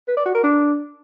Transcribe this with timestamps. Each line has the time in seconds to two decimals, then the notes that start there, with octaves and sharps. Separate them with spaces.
0.08 B4
0.17 D5
0.26 F#4
0.34 A#4
0.43 D4